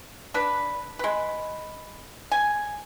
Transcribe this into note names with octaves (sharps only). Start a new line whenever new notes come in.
D4 B4
G#3 B4
G#5